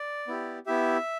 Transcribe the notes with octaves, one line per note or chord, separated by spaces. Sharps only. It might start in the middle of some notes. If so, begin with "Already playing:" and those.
Already playing: D5
B3 E4 G4
B3 E4 G4 E5